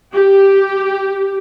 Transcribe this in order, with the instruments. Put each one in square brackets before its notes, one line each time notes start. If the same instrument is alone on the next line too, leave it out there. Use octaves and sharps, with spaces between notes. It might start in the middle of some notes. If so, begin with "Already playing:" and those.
[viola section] G4